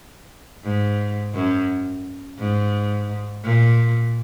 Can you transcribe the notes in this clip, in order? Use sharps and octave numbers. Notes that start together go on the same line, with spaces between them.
G#2
F#2
G#2
A#2